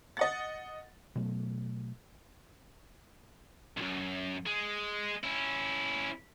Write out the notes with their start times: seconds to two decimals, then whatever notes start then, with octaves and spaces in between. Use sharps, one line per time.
0.17 D#5 F#5 A6
1.15 B2 F#3 A3
3.77 B1 F#2
4.46 G#3
5.24 C#4 E4